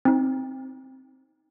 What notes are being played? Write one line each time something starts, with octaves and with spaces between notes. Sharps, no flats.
C4 D#4